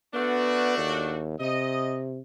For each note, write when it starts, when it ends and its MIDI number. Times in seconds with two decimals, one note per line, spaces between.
0.14 1.22 57
0.14 0.77 59
0.14 1.22 62
0.14 1.22 66
0.78 1.36 39
1.40 2.19 48
1.40 1.95 75